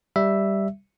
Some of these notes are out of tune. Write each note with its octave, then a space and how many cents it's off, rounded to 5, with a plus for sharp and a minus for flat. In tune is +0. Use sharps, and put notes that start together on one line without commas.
G3 +0 E5 +5